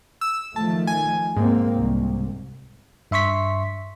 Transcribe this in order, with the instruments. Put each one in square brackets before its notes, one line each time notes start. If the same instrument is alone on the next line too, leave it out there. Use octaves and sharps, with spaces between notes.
[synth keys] E6
[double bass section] D#3 F3 A3 [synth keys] A5
[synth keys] G#5
[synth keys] G#2 [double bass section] A#3 C4
[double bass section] C2
[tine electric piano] G2 E5 C6 C#6 B6